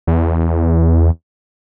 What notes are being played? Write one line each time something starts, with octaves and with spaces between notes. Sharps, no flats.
E2